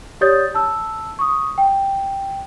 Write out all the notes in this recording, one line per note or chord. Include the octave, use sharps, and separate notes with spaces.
G4 C#5 D5 D#6 G6 A6
A5 E6
C#6 D#6
G5